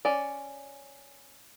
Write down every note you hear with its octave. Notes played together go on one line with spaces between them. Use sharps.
C#4 D5